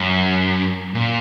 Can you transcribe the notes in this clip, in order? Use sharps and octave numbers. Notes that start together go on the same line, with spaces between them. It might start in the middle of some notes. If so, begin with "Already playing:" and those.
Already playing: F#2
A#2